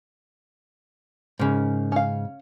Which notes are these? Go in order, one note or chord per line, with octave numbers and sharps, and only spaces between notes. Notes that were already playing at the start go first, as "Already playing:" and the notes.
G#2 C#3 A#4
C#4 F5